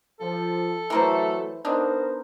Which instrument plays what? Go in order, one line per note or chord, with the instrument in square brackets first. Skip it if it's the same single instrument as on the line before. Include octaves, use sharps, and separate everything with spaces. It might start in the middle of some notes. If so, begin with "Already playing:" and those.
[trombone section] F3 [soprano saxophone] A4
[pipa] E3 A#4 C5 [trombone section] F#3 A3
[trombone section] B3 A#4 C5 [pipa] D4 D#4